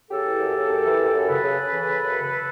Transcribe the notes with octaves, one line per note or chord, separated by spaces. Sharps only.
C#3 G4 A4
E3
F#2
C#3
F#2
E3
F#2
F#2
C#3 A4 B4
C#3
C#3
E3
C#3
F#2
C#3